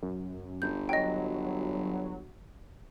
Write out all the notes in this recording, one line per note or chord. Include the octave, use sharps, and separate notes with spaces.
F#2
G1 G6
F#3 D#5 G5